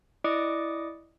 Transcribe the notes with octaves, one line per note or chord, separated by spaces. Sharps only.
E4 D5 D#5 D6 D#6 C#7